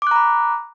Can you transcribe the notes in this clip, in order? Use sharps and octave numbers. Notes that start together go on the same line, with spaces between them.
A#5 B5 D6 F#6